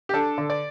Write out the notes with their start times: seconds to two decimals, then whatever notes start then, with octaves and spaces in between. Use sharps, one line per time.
0.09 G4
0.14 D4 A4
0.38 D3
0.50 D5